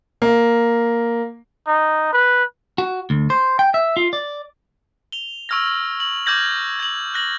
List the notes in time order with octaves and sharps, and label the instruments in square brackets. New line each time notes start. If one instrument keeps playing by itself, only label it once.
[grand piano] A#3
[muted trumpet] D#4
B4
[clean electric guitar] F#4
D2
C5
G5
E5
F4
D5
[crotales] F7 G7
C#6 E6 F6 G#6 A#6
F#7
D6 F6 G6 G#6 A#6 F#7
G#6 F#7
F#6 A#6 F#7